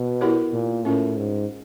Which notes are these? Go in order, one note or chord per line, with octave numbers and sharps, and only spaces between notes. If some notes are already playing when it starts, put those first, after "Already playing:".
Already playing: B2
B3 E4 G4 A#4 C#5
A#2
A2 C#4 F4 A#4
G#2